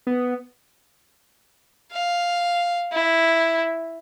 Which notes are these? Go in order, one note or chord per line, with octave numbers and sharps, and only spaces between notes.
B3
F5
E4